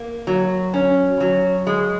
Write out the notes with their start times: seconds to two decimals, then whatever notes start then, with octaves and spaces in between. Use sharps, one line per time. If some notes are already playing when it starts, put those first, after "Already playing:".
Already playing: A#3
0.27 F#3
0.74 C#4
1.20 F#3
1.67 G#3